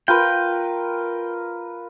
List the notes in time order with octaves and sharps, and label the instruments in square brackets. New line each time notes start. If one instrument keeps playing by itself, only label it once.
[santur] F4 A#4 B4 [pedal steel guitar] G5